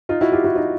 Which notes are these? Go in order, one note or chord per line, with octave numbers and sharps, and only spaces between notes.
D#4 F4
E4 F#4
F4 G4
E4 F#4
D#4 F4